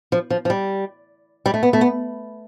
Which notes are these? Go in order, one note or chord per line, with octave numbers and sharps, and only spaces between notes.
F3
F3
F3
G3
G3
A3
B3
A3
B3